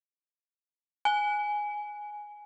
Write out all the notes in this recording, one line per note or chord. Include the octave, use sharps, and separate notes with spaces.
G#5